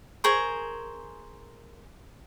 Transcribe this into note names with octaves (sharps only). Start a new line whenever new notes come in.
G#4 A#4 C5 C#6